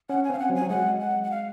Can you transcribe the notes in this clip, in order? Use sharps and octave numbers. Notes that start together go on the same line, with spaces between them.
C#4 F#5
G#5
C4 F5
F#5
F#3
G#5
F#3
G#3 F#5
F#5
F#5
F5